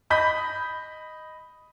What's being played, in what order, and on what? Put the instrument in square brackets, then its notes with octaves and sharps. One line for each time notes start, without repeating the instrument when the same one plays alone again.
[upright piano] D#5 B5 D#6 G6 B6